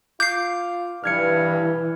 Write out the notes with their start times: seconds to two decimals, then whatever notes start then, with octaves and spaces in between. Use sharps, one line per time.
0.20 F4 D6 G6 C7
1.04 G2 E3 F6 G#6 C#7